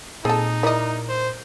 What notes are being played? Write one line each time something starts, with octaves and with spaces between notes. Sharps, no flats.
A#2 C4 D#4 G#4 A4 A5 D#6
E4 A#4 D5 D#5
C5